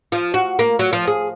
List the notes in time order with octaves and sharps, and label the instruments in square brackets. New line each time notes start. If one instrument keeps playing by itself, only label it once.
[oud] F3
F#4
A#3
F#3
F3
G#4